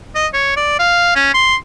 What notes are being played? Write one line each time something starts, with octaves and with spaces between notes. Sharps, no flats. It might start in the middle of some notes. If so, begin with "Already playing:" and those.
D#5
C#5
D5
F5
C#4
C6